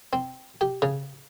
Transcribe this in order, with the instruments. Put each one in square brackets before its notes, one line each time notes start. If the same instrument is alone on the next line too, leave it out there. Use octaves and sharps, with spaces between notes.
[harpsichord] C4
G4
C#3